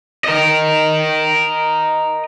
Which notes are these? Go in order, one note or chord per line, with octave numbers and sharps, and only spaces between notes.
A#4 D#5